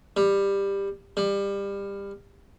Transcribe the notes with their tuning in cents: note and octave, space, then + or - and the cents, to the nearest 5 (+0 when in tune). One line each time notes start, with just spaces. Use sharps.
G3 +15
G3 +25